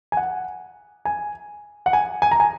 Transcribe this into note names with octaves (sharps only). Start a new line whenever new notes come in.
G#5
F#5
G#5
F#5
G#5
G#5
A#5
G#5